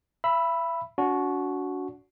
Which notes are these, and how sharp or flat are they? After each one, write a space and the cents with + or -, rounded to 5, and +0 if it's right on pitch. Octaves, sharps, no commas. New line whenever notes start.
E5 +35 B5 +0 E6 +0
D4 -40 F#4 -5